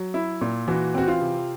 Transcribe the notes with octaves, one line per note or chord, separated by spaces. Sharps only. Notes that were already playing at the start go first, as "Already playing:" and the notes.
Already playing: F#3
E4
A#2
E3 F#4
C4 F#4
F4
C3